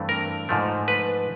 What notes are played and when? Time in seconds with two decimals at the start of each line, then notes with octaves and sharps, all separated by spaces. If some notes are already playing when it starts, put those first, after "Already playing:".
Already playing: G2 E3 A3 C4
0.09 A#4
0.49 G#2 F3 A3
0.88 B4